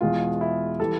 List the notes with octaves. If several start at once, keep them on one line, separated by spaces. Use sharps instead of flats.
E2 B2 G#3 F4
E4
E3 G3 A4